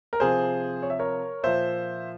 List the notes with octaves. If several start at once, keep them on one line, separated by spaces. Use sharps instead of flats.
A#4
C3 F3 G#4 C5
C#5
E5
A#4 C#5
A#2 F3 C5 E5